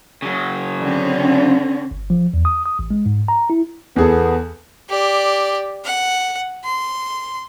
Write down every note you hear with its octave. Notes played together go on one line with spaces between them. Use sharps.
C#3 F#3
D3 C4 C#4
G1
F3
E2
D#6
D#6
A1
G#3
G#2
A#5
E4
E2 B3 G#4 A4
G4 D5
F#5
C6